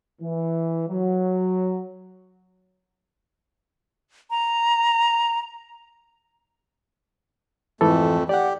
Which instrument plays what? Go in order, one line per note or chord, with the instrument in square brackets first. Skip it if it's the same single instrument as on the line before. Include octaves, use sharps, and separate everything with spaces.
[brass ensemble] E3
F#3
[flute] A#5
[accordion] F2 A3 [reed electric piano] G#2 E3 A4
[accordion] G4 [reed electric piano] D5 F#5